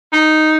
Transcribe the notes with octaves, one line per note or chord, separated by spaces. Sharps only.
D#4